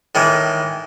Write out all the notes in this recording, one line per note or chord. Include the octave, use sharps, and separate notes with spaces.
A2 D#3 E3